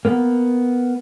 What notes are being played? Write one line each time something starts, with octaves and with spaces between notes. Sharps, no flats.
A#3 B3